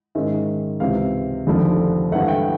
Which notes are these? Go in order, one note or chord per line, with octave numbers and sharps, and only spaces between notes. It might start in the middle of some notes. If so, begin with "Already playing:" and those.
G#2 D#3 G#3 C#4 E5
C#2 C3 E3 F5
F1 D#2 D3 F3
G2 E3 A3 F#5
G5